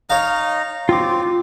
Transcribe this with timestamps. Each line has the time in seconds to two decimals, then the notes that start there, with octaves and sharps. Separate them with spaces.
0.10 D#4 C#5 D#5 F5
0.89 C4 F4 D6